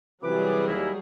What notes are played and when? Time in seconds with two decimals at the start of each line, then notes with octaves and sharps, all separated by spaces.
0.23 C3 E3 F#3 G3 C4 G#4 B4 D6
0.67 D#2 A#3 E4